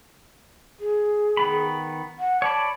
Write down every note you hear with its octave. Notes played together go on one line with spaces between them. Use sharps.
G#4
D#3 B3 B5
F#5
C#5 D5 A5 B5